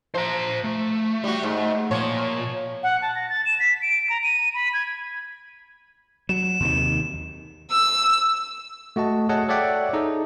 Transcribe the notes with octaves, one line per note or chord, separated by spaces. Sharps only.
F3 C5 A#5
A3
G3 F#4
G#2
A#2 F3 C#5
F#5
A5
A#6
A6
E7
B6
D7
A#5
D#7
B5
G#6
F#3 E7
D#2 C3 D#3
E6
A3 F#4 D#5 A5
G#4 A4 C#5 D#5 F#5 A5
A4 C#5 D5 E5 F#5 G5
D#4 G#4 A4 D#5